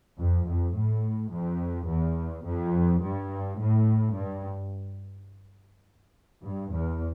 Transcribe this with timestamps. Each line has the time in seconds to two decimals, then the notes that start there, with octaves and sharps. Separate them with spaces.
0.19 F2
0.47 F2
0.75 A2
1.31 F2
1.88 E2
2.45 F2
3.02 G2
3.59 A2
4.15 G2
6.43 G2
6.71 E2